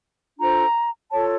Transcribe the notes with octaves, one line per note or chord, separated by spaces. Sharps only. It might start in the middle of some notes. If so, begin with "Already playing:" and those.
D4 F4 A4 C5 A#5
F4 A4 C#5 A5